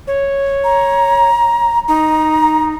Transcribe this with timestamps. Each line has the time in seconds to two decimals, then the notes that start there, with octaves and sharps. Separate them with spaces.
0.07 C#5
0.64 A#5
1.88 D#4 A#5